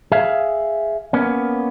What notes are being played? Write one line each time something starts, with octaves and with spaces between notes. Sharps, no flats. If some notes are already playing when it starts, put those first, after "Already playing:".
G#4 E5 F5
A#3 B3 C#4